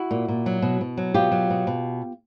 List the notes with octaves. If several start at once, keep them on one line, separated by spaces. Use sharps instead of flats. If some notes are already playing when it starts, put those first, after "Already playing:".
Already playing: E4 F#4
A#2
A#2
F#3
B2
B2
F#3
B2 F4 G4
F#3
B2
B2